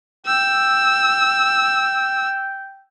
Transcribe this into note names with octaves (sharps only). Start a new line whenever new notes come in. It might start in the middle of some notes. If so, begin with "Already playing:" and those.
G5 E6